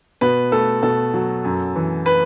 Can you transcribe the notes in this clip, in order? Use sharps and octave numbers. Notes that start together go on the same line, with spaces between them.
B2 B4
A3 A4
B2 A4
F#3
F#2
E3
B4